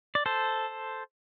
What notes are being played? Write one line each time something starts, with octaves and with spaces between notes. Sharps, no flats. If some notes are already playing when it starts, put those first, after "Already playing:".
D5
A4 C5